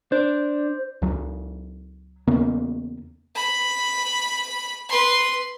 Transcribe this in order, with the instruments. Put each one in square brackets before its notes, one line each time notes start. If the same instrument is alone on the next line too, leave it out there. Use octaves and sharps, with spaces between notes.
[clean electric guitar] D4 [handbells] C5
[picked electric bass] C#2 F#3
E2 C#3 A#3 B3
[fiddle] B5
B4 C6